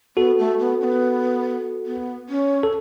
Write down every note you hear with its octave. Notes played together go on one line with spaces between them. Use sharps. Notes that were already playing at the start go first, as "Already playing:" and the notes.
B3 F#4 A4
A3
B3
C#4
B3
B3
C#4
A4